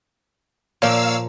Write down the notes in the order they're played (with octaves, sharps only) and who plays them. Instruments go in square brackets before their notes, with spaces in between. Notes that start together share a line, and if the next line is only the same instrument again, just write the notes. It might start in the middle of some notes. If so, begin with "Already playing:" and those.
[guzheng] A#2 F3 A#4 [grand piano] A#3 C#5 D5 [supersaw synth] F5 E6